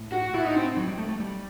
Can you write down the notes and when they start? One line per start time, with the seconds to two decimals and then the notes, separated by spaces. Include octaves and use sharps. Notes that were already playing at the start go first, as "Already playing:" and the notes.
Already playing: A2
0.12 F#4
0.34 A2 E4
0.45 D#4
0.56 C4
0.77 F#3
0.88 G3
0.98 A3
1.09 A3
1.20 G3